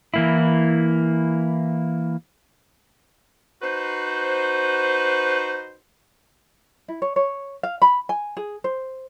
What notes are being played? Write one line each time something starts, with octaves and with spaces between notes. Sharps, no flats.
E3 A#3 E4
D#4 F#4 B4 C5
E4
C#5
C#5
F5
B5
G#5
G#4
C5